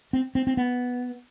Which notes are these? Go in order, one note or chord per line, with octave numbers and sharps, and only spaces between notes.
C4
C4
C4
B3